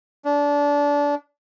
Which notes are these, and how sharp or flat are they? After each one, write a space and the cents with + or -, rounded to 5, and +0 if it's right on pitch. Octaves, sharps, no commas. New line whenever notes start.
D4 -25